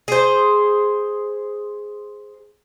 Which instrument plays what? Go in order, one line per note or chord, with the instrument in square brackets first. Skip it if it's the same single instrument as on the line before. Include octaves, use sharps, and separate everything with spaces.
[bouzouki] G#4 C5